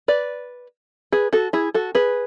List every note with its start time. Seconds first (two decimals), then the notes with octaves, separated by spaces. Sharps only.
0.08 B4 D5
1.12 G#4 B4
1.33 F#4 A4
1.53 E4 G#4
1.74 F#4 A4
1.95 G#4 B4